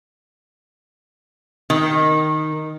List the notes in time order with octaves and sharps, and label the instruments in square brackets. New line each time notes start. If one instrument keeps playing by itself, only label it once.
[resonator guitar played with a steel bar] D#3